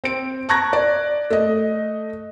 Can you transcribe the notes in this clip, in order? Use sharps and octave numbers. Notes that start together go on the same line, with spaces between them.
C4 D7
A5 A#5 C#6 F#6 G#6 A#6
D5
A3 D#5